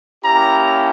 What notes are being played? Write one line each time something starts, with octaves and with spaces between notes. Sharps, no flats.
A#3 C#4 E4 G4 A#5